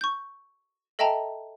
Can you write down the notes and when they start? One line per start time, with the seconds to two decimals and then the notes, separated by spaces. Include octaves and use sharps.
0.01 C#6 G6
0.99 A4 D#5 E5 G5 A5 A#5